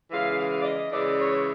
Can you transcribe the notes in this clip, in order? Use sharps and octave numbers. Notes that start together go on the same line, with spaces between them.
C#3 E3 G#3 F5
F5
D5
D#5
C#3 E3 G#3 D5
C#5